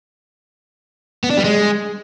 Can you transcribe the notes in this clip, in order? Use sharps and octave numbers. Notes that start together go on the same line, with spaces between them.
B3
D4
G3
G#3